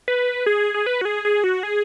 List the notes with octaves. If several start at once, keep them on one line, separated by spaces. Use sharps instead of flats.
B4
G#4
G#4
B4
F#4
G#4
G#4
F#4
G#4